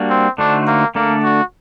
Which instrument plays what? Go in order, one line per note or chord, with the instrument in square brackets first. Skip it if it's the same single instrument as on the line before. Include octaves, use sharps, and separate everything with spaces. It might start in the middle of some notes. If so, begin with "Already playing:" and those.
Already playing: [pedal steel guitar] G3 A#3 D4 F#4
[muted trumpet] C4
[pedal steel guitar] D3 A3 D#4 F#4 C5 [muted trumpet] D4
[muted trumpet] A#3
[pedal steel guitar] D3 A3 D4 A4 D5 [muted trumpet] A#3
[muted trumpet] F#4